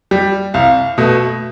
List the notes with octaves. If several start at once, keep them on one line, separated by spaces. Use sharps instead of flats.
G3
C2 F5
B2 A3